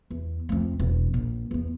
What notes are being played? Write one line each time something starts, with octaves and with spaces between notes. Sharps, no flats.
E2
F2 A3
E1
A#1
E2 B3